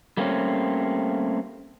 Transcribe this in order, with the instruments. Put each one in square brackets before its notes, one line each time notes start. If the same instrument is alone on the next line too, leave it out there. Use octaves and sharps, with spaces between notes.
[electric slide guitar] G3 A3 A#3 C4 C#4